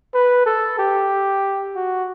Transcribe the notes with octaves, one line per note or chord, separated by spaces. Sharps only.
B4
A4
G4
F#4